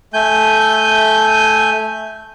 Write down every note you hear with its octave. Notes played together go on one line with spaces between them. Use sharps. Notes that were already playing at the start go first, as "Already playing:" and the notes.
A3 G#5 G6